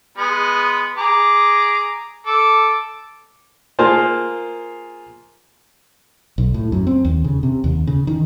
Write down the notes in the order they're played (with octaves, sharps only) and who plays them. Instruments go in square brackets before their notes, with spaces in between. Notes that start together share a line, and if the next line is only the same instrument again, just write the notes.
[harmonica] G#3 B3 B5
G#4 A#5 D6
A4 D6
[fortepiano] A#3 F4 G#4 A#4 C5 A5
[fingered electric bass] B1
A2
F#2
C4
D#2
C#3
C3
D#2
C#3
D#3